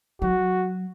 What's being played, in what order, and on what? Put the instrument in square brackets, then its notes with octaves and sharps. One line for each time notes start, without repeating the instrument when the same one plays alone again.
[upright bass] F#3 [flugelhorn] F#4